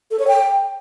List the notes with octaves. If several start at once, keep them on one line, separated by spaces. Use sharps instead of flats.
A4
C#5
G5